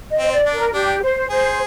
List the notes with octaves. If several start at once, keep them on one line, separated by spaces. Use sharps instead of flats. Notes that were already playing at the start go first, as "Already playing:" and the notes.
D#5
C4 C5
D5
D4
A#4
D4 G4
C5
G#4 C5